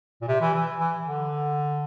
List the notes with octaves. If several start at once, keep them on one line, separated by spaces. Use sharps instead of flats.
A#2
C3
E3
E3
E3
D3